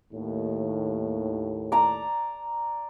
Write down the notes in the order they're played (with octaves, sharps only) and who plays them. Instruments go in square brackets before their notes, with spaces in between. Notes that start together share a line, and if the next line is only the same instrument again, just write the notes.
[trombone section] D#2 A2
[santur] D5 A#5